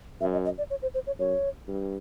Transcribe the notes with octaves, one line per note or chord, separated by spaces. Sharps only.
F#2 E5
D#5
D#5
D5
C#5
C5
C5
C#5
F#2 C#5
G2